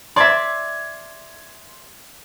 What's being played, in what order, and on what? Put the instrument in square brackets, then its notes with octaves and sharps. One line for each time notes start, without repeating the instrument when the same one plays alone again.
[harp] D5 E5 [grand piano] C6 G#6